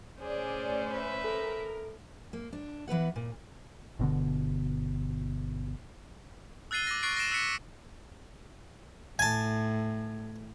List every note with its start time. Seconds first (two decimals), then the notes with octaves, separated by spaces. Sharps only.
0.21 A2 C#4 G#4 C5 D5
0.92 B4 E5
1.24 A4 A#4
2.33 A#3
2.53 D4
2.88 E3 B3 B4 F#5
3.16 A#2
3.99 G1 B2 D3
6.71 E6 F#6 A6 C7 D#7 G7
6.87 D6 A#6
7.03 C#6 F#6 A6 C7 D7
7.17 A#6 C7 D7 E7
7.32 E6 F#6 B6 C#7 D#7
9.19 A2 G#5 A5